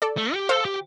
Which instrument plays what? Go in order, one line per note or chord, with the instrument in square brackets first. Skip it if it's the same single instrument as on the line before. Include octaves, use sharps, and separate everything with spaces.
[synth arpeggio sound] A4 D5
[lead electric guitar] A3
G4
[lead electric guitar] A4 [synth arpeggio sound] C5 F5
[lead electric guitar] G4